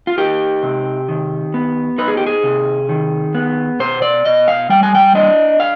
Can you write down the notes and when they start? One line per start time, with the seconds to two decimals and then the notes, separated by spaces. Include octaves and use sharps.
0.07 F4
0.18 D#4 G4
0.63 C3
1.09 D#3
1.54 B3
1.98 D#4 B4
2.08 G#4
2.17 G4
2.27 G#4
2.44 C3
2.89 D#3
3.34 B3
3.80 B2 C5
4.02 D5
4.25 B2 D#5
4.48 F5
4.70 G3 G5
4.83 G#5
4.95 G5
5.15 D4 D#5
5.60 F5